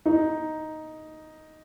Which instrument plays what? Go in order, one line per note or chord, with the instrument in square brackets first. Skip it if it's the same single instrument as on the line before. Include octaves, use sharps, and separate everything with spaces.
[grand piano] D#4